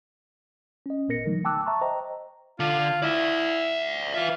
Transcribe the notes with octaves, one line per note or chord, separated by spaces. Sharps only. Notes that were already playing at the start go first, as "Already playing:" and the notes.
C#4 D#5
G1 A#2 B3 A#4 A#6 C#7
D3 E3 F#3 A3 D#4
G5 A5 D6 E6 F#6
E5 A5 A#5 C#6
C5 D#5 G5 A#5
D3 F4
E4 D5 E5
F4 B4 E5